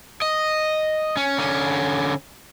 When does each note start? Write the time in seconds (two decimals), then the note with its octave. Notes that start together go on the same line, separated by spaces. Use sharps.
0.22 D#5
1.17 C#4
1.38 D3 C#4